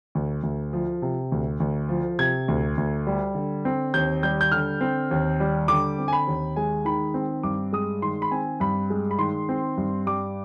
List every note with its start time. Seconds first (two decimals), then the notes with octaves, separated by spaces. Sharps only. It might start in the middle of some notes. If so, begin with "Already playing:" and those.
0.15 D2
0.43 D2
0.73 F3
1.02 C3
1.32 D2
1.60 D2
1.89 F3
2.19 C3 G#6
2.48 D2
2.77 D2
3.07 G3
3.35 D3
3.65 C4
3.94 D#2 G6
4.23 G3 G6
4.41 G6
4.52 D3 F6
4.81 C4
5.11 D#2
5.40 G3
5.68 D3 D6
5.99 C4
6.08 G#5
6.13 B5
6.27 D#2
6.56 G#3 G#5
6.85 D#3 B5
7.14 C4
7.43 G2 D6
7.73 G#3 D#6
8.02 D#3 C6
8.22 B5
8.31 C4 G#5
8.60 G2 B5
8.90 G#3
9.11 B5
9.18 D#3 C6
9.49 C4
9.77 G2
10.06 G3 D6